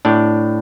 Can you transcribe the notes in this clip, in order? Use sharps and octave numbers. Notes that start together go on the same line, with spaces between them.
A2 D4